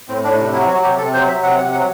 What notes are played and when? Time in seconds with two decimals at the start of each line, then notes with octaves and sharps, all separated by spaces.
0.08 A2 C4
0.23 A2 D4
0.38 C3 D4
0.53 F#3 E4
0.68 F#3 F#4
0.83 C3 G4
0.98 C3 A4
1.13 F#3 C5
1.28 F#3 E5
1.43 C3 F#5
1.57 C3 F#5
1.72 F#3 F#5